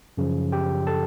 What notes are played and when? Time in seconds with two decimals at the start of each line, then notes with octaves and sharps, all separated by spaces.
0.17 F#2 C#3 F3
0.52 G4 G5
0.87 A4 A5